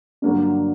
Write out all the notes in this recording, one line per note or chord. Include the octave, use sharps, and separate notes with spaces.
G2 D3 F#3 A#3 D4